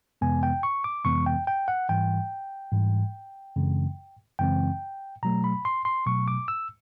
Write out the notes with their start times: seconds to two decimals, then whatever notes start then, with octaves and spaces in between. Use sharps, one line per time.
0.21 F2 C3 E3 G#3 B3 G#5
0.43 G5
0.63 C#6
0.84 D6
1.05 F2 C3 E3 G#3 B3 C#6
1.26 G5
1.47 G5
1.68 F#5
1.89 G#2 E3 G3 G5
2.72 G#2 E3 G3
3.56 F#2 C#3 E3 G#3 C4
4.39 F#2 C#3 E3 G#3 C4 G5
5.23 B2 F#3 A3 A#5
5.44 B5
5.65 C6
5.85 C6
6.06 B2 F#3 A3 C#6
6.28 D6
6.48 E6